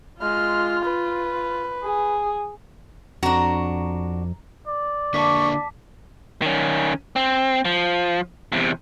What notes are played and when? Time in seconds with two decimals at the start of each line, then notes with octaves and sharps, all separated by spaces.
0.21 G#3 F4 F6
0.84 B4
1.84 G#4
3.23 F2 D4 F#4 A#5
4.67 D5
5.14 D3 A#3 D4 A5 C#6 D6 B6
6.42 D#3 C#4
7.16 C4
7.65 F3
8.52 E2 C3